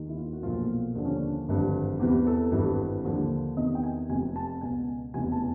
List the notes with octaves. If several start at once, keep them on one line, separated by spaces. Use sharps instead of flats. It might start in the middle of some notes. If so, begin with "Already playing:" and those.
Already playing: D#2 D#3
E4
F4
F#4
B1 A#2 F3 F4
D#2 D3 F3 D4
C#4
D4
G#1 G2 D3 F3
E2 C3 E3 G4
A4
G#1 G2 E3
D#2 D3 F3
E2 C3 D#3 D#5
G5
G#5
F1 F2 C3 F3 G#5
A5
C#2 B2 G#5
F1 E2 C#3 E3 G#5
A5